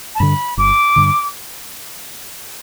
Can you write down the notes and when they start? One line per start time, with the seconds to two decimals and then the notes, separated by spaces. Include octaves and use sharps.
0.15 A5
0.19 G2 D3 B5
0.57 G1 D6
0.96 G2 D3